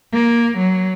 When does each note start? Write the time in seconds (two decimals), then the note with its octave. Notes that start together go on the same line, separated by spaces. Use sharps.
0.13 A#3
0.58 F#3